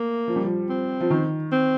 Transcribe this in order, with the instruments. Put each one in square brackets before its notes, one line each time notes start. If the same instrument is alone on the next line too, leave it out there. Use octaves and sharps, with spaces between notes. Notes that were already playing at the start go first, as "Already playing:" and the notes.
Already playing: [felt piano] A3 [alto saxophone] A#3
[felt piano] F3
G3
F3
[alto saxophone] C4
[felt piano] F3
D#3
[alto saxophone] C4